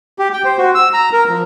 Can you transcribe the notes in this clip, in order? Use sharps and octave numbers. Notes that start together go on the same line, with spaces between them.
G4
G5
C5
F#4
E6
A#5
A#4
F3